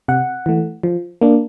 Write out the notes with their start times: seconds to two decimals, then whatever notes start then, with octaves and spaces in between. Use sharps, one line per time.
0.08 C3 F#5
0.46 E3 A3
0.83 F3
1.21 A#3 D4